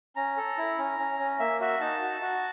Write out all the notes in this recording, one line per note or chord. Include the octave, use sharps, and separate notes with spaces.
C#4 A#5
A4
E4
C#4
C#4
C#4
A#3 E5
F#4 E5
D#4 A5
F#4
F#4